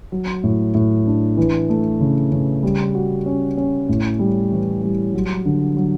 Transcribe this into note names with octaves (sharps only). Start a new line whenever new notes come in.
F#3
A2
A2
D4
E3
A3
C#3
C#3
G3
F#4
C#4
C#4
A2
G3
E3
G3
F#3
D3
F#3